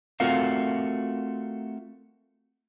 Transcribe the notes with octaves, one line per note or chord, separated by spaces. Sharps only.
A3 C4 F4 F#4 A#4 F5